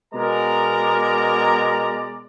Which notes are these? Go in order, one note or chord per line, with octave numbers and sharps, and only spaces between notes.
B2 G#3 A#4 D5 A#5